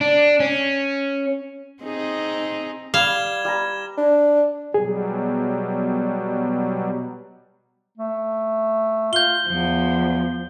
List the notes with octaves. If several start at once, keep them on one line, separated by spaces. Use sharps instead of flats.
D4
C#4
C4 D#4 G#4
G3 F5 G#6 E7 G7
G3 A#5
D4
B2 F#3 G3 G#4
A3
F4 G6 G7
E2 F3